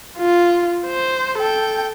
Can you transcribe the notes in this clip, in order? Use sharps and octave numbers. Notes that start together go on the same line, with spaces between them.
F4
C5
A4 G5